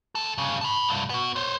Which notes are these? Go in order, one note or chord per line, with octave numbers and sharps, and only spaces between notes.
D2 A4
G2 C#3
A5 B5
C2 G2
B3 F#4
C5 C#5